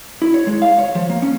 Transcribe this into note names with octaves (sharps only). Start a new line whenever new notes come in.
E4
C#5
G#3
F5
C#5
F3
A#3
C#4